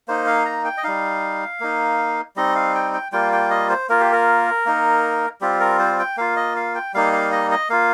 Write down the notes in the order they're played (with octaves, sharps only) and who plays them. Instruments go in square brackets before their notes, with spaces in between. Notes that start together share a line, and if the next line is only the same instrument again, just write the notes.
[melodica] A#3 D#4 C5
F5
A#5
G5
D#5
G3 D#4 F5
A#3 D#4
G3 C4 D#4 D#5
F5
G5
G5
G3 A#3 F4 G5
G5
D#5
C5
A#3 F4 A#4
G4
A#4
A#3 D#4
G3 C4 F4 G4
A#4
C5
G5
A#3 F4 F5
D#5
F5
G5
G3 A#3 D#4 F5
F5
D#5
D#5
A#3 F4 F5